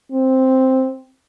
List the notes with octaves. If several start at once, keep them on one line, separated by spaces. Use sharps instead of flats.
C4